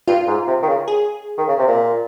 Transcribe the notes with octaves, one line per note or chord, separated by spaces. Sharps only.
G2 F4
G#2
C3
D#3
C#3
G#4
D#3
C#3
C3
A#2